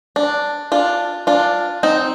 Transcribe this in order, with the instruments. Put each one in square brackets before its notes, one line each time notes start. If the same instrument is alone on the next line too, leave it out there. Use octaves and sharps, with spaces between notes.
[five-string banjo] D4
D4 F4
D4 F4
C4 D#4